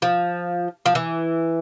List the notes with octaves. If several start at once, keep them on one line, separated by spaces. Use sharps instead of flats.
F3
F3
E3